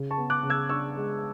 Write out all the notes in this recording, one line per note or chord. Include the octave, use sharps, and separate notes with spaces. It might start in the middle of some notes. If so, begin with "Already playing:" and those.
Already playing: C#3
A5 C#6
B3
D6 F#6
C#3
E6 G#6
D4 C#6 E6
G#3